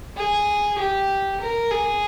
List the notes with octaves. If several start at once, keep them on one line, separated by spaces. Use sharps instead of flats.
G#4
G4
A#4
G#4